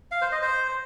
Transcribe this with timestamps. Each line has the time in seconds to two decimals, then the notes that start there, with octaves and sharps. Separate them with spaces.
0.11 F5
0.22 C5
0.32 D#5
0.42 C5